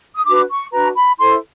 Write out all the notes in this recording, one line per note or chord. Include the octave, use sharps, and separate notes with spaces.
D#6
D4 F#4 B4 D6
C#6
D4 F#4 B4 A#5
B5
E4 A4 C5 C6